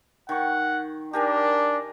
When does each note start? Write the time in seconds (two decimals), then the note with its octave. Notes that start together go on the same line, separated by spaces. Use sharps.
0.29 D#3 F#5 C#6
1.13 D4 G4 A#4 G#5